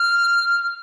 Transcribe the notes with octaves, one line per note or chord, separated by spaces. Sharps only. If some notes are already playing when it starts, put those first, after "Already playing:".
Already playing: F6